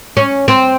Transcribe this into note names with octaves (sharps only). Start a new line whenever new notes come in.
C#4
C4